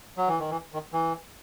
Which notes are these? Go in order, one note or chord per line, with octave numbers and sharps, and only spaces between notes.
F#3
E3
D#3
E3
D#3
E3